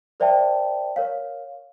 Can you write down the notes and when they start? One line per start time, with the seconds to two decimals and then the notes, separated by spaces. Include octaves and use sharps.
0.20 A#4 C5 D5 E5 G5 A5
0.96 A#4 C#5 F5